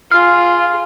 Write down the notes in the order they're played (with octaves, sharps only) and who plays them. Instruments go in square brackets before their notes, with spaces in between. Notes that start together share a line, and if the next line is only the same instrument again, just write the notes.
[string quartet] F4 G#4 [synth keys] F5